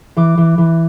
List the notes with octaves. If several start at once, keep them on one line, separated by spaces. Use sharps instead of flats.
E3 D6
E3
E3